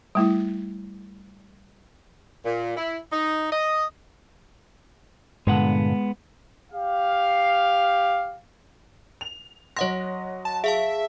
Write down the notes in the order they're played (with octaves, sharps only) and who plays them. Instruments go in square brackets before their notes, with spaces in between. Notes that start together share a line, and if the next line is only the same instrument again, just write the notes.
[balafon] G3 A3 E4
[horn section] A#2
E4
D#4
D#5
[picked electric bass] G2 A#2 D3 [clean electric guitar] G#3 B3 F#5
[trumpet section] G4 F5
[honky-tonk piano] F7
[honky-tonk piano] F#3 D#5 A#6 [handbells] C#5 F#5 C6
[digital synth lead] A5
[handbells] G#4 F5 A5 [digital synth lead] E5